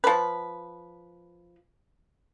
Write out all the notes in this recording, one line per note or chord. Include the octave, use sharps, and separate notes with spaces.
F3 B4